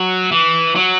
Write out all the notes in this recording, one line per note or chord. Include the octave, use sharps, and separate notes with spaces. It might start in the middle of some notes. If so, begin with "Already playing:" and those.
Already playing: F#3
E3
F#3